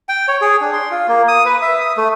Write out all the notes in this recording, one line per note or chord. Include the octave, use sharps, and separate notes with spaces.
G5
C#5
G#4
D4
C6
F4
A#3
D#6
B4
E5
D#6
A3